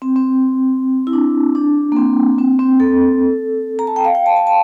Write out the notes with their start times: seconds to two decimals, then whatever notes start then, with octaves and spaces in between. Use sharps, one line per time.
0.02 C4
0.16 C4
1.07 E4
1.13 D4
1.55 D4
1.92 A#3
1.96 C4
2.38 C4
2.59 C4
2.80 A4
3.79 A#5
3.87 A5
3.96 G5
4.05 F5
4.15 G5
4.26 A5
4.36 A5
4.47 A5